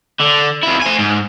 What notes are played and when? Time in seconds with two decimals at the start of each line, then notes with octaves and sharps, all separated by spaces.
0.20 D3
0.63 F2 E4
0.82 C5 G#5
0.99 G#2